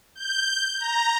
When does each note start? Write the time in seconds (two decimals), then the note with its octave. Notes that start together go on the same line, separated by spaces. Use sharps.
0.15 G6
0.79 A#5